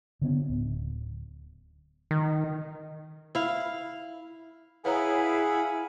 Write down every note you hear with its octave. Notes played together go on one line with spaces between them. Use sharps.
D3 B3 C#4
D1
D#3
E4 F5
E4 G#4 B4 C#5 F5 F#5 A#5 B5